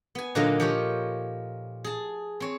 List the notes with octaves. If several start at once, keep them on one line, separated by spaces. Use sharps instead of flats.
B3 G#5
A#2 D3 F#3 A#3 D#4 F4
F3 G4 C#5
G#4 A5
C4 C#5